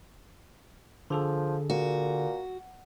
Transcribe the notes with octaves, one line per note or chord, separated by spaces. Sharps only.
D3 F3 G#4 A4
A#2 F#4